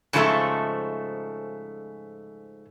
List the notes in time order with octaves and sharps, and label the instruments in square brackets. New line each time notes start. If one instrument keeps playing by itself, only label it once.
[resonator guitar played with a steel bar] G#2 C#3 F3 A3 A4 E5